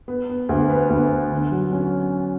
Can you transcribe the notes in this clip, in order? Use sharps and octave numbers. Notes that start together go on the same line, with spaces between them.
B3
B3
D2
B3
D2
B3
D3
F#3
C#4